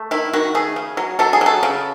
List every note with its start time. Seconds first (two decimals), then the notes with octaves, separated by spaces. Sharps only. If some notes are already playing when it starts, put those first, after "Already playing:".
Already playing: A3
0.11 D#3 E4
0.33 D#3 F#4
0.55 A3 G#4
0.76 C#3
0.97 F#3
1.19 F#3 A4
1.33 G#4
1.41 F#3 A4
1.63 C#3